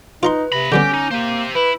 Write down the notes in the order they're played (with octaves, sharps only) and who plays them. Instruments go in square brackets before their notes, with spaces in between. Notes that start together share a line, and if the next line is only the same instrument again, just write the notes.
[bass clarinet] D#4 [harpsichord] F4 A#5 C6 [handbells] B4
[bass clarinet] C3 [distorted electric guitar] A#3 B5 [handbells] A#6
[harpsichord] D3 G3 B3 [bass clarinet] C#4 [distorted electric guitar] G4 [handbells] D6 G6
[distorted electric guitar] D#4
[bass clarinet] A#3 [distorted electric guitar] G4 C5
[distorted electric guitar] E4 [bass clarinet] B4